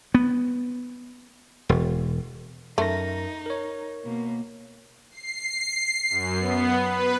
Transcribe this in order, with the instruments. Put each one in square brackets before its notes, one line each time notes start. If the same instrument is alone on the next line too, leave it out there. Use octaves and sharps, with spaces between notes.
[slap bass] B3
E1
[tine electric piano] F#2 A#4 A#6 [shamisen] A3 [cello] D#4
[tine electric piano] A#4 C#5
[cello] B2 A#3
[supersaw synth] C7
F#2
B3
B4